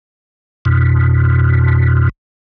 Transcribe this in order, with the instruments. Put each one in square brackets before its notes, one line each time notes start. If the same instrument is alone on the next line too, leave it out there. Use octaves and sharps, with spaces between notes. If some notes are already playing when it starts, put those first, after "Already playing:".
[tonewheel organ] F2 B2